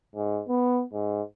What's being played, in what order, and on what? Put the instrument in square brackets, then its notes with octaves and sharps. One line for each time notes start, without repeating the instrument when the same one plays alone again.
[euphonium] G#2
B3
G#2